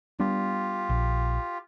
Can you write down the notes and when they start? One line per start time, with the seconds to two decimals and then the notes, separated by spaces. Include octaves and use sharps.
0.20 G3 B3 D4 F4 G4
0.90 A#1